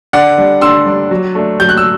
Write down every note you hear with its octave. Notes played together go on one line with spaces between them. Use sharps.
D3 D5 F#5
G3 D4
D3 C6 E6
G3 D4
F#3
A3 D4
F#3 G6
F#6
E6